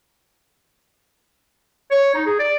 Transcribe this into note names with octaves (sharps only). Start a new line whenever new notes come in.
C#5
D#4
G#4
D5